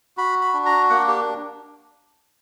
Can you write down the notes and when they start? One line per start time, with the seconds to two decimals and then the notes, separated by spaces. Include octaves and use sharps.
0.17 F#4 B5
0.41 B5
0.54 D4
0.66 A#5
0.90 A#3 F#5
1.08 G4